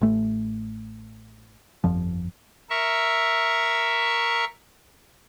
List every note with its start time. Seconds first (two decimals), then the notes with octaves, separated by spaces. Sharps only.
0.01 A1 A3
1.84 G1 F2 F3
2.70 A#4 E5 C#6